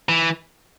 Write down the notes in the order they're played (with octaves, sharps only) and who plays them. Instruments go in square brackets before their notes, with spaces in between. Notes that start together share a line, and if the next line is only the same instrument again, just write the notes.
[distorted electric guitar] E3